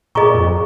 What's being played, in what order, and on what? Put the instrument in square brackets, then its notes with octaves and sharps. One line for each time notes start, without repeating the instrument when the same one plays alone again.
[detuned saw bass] A#2 [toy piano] G#4 D#5 A#5 C#6
[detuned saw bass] F2